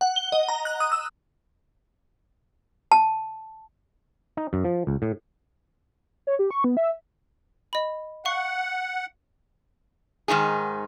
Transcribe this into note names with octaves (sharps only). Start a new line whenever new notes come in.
F#5
G7
D#5
A#5
F#6
D#6
E6
A5
D#4
F#2
F3
C#2
A2
C#5
G4
C#6
B3
E5
D#5 B5
F5 F#5 C#6
G#2 D#3 D#4 G#4